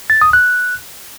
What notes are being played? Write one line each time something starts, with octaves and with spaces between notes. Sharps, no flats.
A6
D#6
F#6